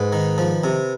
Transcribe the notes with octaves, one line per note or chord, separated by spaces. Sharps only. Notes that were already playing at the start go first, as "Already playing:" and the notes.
Already playing: G#2 B4
D#3
F3
C3